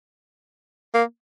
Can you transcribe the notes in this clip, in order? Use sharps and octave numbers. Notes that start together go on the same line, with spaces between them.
A#3